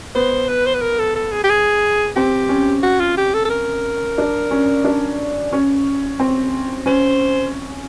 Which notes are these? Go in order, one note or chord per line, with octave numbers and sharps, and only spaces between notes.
B3 C5
B4
C5
B4
A#4
A4
A4
G#4
G4
G#4
C4 G4
C#4
F#4
F4
G4
A4
A4
A#4
D4
C#4
D4
C#4
C4
C#4 C5